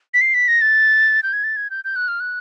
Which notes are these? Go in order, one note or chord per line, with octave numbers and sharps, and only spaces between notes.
B6
C7
B6
A#6
A6
G6
G#6
A6
G#6
G6
G6
F#6
F6
F#6